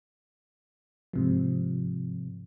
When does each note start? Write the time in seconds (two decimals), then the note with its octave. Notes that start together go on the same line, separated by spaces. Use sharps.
1.13 G#2 C3 F3